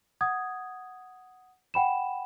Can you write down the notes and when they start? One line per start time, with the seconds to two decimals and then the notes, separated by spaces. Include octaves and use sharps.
0.21 F#5 D#6 G#6
1.74 F#5 G5 B5 E7